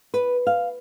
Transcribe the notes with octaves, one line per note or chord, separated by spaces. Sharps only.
B4
F5